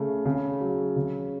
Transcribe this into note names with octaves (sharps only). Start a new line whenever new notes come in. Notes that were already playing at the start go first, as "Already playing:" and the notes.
Already playing: C#3 A3
C#3
F#3
C#3